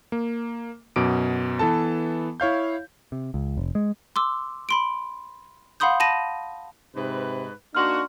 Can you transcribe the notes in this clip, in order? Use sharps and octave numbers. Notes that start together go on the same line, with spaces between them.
A#3
F#2 B2 D6 D7
E3 B3 A4 A5
E4 C#5 F5 G6
C3
C#2
F1
G#3
C6 D6 E6
B5 C6 D7
F5 F#5 B5 C6 D#6 G6
A5 B5 A#6 D#7
G#2 C3 D#4 B4
A#3 D4 D#4 F#4 C6 F6